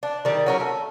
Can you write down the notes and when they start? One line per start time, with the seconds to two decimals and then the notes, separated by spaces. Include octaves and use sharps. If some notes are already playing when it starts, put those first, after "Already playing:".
0.03 D4
0.25 D#3 G3
0.46 F#3 C#4 A#4
0.60 A3